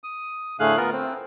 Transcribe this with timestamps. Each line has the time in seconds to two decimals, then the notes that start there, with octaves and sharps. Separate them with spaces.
0.04 D#6
0.60 A2 D3 A3 G#4 F5 F#6
0.77 B3 F4 A#4
0.93 C4